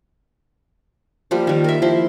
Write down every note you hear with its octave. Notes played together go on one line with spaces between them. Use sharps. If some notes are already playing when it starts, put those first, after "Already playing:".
F3 G3 A#3
D#3 G3
A#4 E5
F3 E4 C6